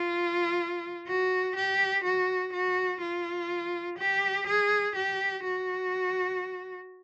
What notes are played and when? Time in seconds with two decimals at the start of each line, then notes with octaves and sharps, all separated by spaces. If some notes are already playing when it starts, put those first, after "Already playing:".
Already playing: F4
1.08 F#4
1.56 G4
2.04 F#4
2.53 F#4
3.01 F4
3.98 G4
4.47 G#4
4.95 G4
5.43 F#4